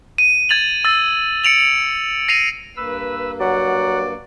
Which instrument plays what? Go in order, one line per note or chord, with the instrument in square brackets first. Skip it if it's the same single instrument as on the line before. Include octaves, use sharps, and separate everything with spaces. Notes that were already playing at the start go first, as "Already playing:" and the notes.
[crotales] D#7
G#6 A6 F7 F#7
E6 A6
C#7 D7 F7 F#7
A#6 C7 D7 D#7 F7
[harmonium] G2 A#3 [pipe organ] B4 E6
[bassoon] F#3 [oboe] D5 [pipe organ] F#5